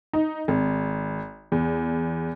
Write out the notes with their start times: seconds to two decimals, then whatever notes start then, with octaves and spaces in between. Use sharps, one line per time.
0.13 D#4
0.48 G#1
1.52 E2